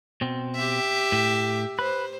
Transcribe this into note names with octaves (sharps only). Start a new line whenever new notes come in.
B2 C4
G4 E5
A2
B4 C5